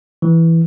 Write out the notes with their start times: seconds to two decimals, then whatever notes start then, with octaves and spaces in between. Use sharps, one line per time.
0.22 E3